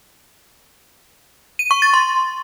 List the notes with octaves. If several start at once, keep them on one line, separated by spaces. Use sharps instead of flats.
D#7
C#6
A6
C6